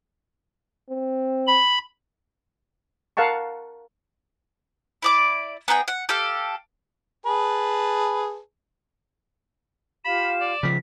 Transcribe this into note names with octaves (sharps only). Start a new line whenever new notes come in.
C4
B5
A#4 F5 F#5 A5 C#6
E4 D5 D6
B3 D#4 G#4 G5
F#5
G4 A4 F5
G#4 B4 A5
F4 G4 F5 B5 E7
D5
C#3 F3 B6